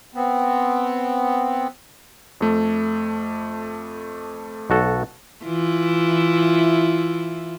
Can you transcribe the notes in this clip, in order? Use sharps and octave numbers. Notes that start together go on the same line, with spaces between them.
B3 C4
F2 A3
B1 F#4 A4
E3 E4 F4